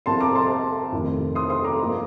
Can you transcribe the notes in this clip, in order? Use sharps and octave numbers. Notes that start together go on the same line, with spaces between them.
C2 C3 F3 A5 C6
A#5 D6
A5 C6
F2 C3 D#3 A3
C6 D#6
C6 D#6
A#5 D6
G2 F3 A#3